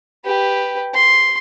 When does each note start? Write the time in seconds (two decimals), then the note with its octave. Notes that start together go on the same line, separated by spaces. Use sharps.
0.25 G4 B4
0.94 C6